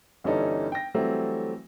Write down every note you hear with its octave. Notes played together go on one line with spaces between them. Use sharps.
G1 E3 G3 C#4 D#4 A4
G5 A#6
E3 F#3 G3 A3 C4